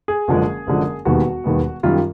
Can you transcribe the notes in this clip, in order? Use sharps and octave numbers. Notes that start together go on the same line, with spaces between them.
G#4
F#1 F#2 D3 F3 G#3
F#1 F#2 D3 F3 G#3
E1 D#2 D#3 G3 B3 F#4
E1 D#2 D#3 G3 B3
F#2 D#3 G3 F4